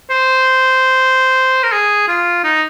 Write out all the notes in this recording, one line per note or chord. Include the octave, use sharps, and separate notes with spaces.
C5
A#4
G#4
F4
D#4